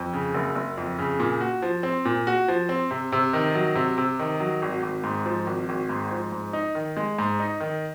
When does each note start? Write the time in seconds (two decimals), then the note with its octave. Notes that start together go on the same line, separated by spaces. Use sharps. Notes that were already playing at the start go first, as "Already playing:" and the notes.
Already playing: F2
0.13 C#3
0.35 F#1
0.55 F#1
0.77 F2
0.99 C#3
1.20 A#2
1.41 F#4
1.62 F3
1.83 C4
2.05 A#2
2.27 F#4
2.48 F3
2.69 C4
2.91 C3
3.12 C3
3.33 D#3
3.55 F#3
3.75 C3
3.98 C3
4.19 D#3
4.40 F#3
4.62 G#1
4.83 G#1
5.04 G#2
5.26 F3
5.47 G#1
5.69 G#1
5.89 G#2
6.11 F3
6.32 G#2
6.53 D#4
6.75 D#3
6.97 G#3
7.19 G#2
7.40 D#4
7.60 D#3